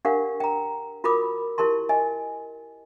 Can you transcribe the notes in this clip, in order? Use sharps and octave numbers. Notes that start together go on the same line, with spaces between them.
D4 G4 A#4 F5 F#5
G5 A#5
F4 F#4 A#4 B5 D6 D#6
E4 G4 A#4 A5 C6
D#5 G#5